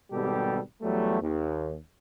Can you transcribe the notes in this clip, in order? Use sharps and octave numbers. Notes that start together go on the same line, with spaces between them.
G#1 B2 G3 G4 A4
E2 F#3 G3 A3
D#2